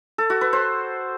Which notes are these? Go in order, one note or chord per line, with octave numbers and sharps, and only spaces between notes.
A4
F#4
B4
C5